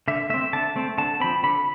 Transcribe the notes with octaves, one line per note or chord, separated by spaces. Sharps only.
D3 E5
A3 C4 E5
D3 A5
A3 C4
D3 A5
F3 C4 B5
D3 B5